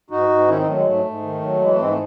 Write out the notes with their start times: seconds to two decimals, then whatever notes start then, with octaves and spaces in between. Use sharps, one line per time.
0.10 G#2 D#4 F#4
0.29 G#2
0.48 D#3 C#4 E4
0.57 C4 D#4
0.67 F#3 A3
0.76 G#3
0.85 G#2 A3
1.05 G#2
1.22 D#3
1.42 F#3
1.61 E3 G#3
1.71 A3
1.79 G#2 G#3 C4
1.89 A3